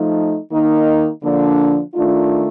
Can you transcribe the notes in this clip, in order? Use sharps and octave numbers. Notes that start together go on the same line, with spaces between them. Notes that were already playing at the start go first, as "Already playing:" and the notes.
Already playing: F3 A3 D#4
D#3 A#3 D#4
D3 F3 A#3 D4
D#3 A3 D4 F4